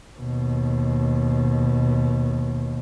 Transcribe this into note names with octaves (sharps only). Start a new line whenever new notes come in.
D#2 B2